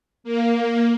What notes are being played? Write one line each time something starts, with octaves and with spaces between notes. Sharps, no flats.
A#3